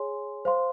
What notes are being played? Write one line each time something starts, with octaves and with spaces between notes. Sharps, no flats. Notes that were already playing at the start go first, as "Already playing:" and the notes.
Already playing: G#4 C#5 G#5 C6
C5 F5 C6